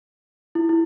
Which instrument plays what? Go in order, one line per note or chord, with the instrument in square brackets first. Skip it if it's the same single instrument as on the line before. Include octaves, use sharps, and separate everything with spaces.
[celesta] E4
E4